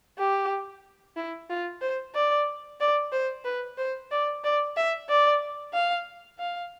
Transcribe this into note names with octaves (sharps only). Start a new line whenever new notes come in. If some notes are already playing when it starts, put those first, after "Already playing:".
G4
E4
F4
C5
D5
D5
C5
B4
C5
D5
D5
E5
D5
F5
F5